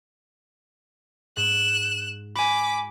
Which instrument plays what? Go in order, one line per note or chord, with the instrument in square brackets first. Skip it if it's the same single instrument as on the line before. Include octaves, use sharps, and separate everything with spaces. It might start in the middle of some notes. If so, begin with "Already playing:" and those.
[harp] G#2 [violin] F#6 E7
[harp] F#4 [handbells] G#5 B5 [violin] D6 B6